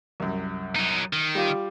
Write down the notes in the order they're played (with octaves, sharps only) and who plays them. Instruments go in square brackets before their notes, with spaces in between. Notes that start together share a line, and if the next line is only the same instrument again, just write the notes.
[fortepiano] C2 F#2
[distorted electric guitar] F#3 D#4
D#3
[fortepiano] G3 F4 G4